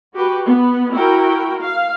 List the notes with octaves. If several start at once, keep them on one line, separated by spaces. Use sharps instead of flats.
F#4 G4 B4
B3
E4 F#4 A#4 G5
F5